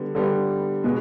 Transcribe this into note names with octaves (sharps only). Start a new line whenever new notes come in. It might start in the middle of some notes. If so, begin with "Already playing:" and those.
Already playing: D3 G3 B3
D3 G3 B3
B2 G#3 B3